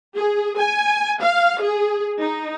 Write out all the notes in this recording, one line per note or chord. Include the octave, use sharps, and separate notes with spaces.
G#4
G#5
F5
G#4
D#4